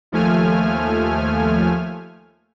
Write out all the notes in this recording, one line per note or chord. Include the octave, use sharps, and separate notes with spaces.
D#2 F3 A3 G#5 F6